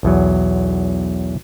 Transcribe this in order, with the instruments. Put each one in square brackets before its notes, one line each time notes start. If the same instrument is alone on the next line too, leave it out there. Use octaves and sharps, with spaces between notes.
[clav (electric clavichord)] B1 E2 F#3